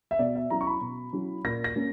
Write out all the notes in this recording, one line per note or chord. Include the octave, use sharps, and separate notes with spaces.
E5
B2 D5
E5
F#3 C#4 E4 A#5
C#6
B5
B2
F#3 C#4 E4
A#2 A#6
A#6
A#3 C#4